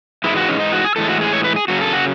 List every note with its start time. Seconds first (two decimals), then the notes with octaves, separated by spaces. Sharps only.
0.24 G#2 E3 G#3 E4
0.37 F#4
0.48 C#4
0.60 D#4
0.73 F#4
0.84 G#4
0.96 A2 E3 G#3 A4
1.09 F#4
1.21 G#4
1.33 C#5
1.44 B4
1.56 G#4
1.68 F#2 C#3 F#3 F#4
1.81 A4
1.93 F#4